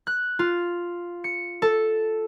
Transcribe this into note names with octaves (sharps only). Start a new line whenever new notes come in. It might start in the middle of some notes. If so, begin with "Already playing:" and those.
F#6
F4
C#7
A4